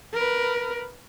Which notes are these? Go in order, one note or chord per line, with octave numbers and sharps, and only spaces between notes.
A#4 B4